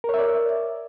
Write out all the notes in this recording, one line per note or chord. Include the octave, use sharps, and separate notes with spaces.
A#4 C#5 D5 E5